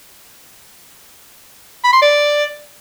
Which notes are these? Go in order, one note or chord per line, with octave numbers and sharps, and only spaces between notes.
B5
C6
D5